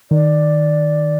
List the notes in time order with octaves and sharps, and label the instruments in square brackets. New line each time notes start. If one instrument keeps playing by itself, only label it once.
[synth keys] D#3 [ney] D5